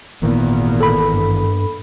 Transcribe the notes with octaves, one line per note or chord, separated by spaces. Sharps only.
G#1 E2 A#2 D#3 E3 A#3 B3
A4 B5
G2